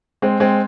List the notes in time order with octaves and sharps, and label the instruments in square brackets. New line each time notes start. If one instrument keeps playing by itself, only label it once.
[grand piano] G#3 C4
G#3 C4